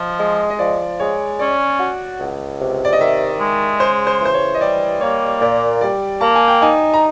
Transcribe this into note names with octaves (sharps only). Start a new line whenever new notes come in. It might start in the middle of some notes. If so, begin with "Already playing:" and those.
Already playing: F3 D#5
G#3
D#5
F3 D5
G#3 C#5
C#4 D5
F#4
C#2
C3
D5
D#5
D#3 E5
G#3
C#3 C5
C5
E3 C5
C#5
D#5
G3 D5
A#3 C#5
A#2 D5
G3 D5
A#3 A5
G#5
G5
D#4 G#5
A#5